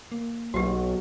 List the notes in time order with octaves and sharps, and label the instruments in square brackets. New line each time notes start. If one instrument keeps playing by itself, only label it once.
[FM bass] A#3
[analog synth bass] B1 [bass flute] F#3 [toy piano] F#4 G4